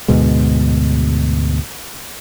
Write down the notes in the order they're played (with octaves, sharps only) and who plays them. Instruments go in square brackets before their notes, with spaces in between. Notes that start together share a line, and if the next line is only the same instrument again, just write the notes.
[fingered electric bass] D2 G#2 B2 G#3